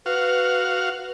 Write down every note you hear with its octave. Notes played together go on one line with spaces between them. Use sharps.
F#4 B4 F5